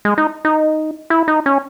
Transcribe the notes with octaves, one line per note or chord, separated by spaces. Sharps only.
G#3
D#4
D#4
E4
D#4
C#4